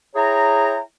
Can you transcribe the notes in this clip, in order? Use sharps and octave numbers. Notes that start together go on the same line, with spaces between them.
E4 G#4 C#5 G5 A#5